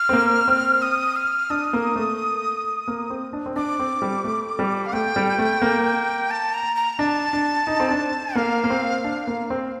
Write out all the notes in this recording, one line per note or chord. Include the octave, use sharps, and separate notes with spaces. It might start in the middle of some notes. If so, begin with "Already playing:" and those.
Already playing: F6
C4
A#3
C4
D#6
F6
D4 D#6
A#3
A3
A#3
C4
D4
C4
D4 D6
C4
G3
A3
G3
F5
A3 G5
G3
A3
A#3
A5
A#5
A#5
D4 A5
D4
D#4
C4
D4
A#3 F5
A#3
C4
D4
A#3
C4